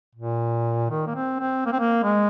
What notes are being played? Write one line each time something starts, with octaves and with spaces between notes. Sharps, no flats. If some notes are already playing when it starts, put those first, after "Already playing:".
A#2
D#3
A#3
C4
C4
A#3
C4
A#3
G#3